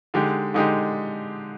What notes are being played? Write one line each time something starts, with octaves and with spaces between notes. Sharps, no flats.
D3 G#3 D#4 G4
D3 G#3 D#4 G4